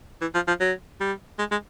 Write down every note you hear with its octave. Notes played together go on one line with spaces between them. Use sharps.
E3
F3
F3
F#3
G3
G#3
G#3